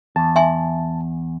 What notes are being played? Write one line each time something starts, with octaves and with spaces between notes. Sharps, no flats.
E2 A5
E5 G#5 C6